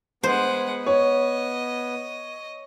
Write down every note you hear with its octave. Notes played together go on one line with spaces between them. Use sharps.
G#3 B3 C5 F#5
C#5 D#5